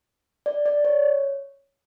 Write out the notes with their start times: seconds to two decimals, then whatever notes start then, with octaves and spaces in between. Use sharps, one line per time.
0.46 D5
0.66 D5
0.85 C#5